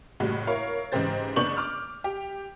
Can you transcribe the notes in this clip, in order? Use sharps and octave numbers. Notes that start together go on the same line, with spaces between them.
F#1 A2 G3 F#4
E4 A#4 C#5 F5
G#2 C#3 E3 G4 C5 A6
F#1 B3 D4 C#6 G6 F#7
D6 F6
G4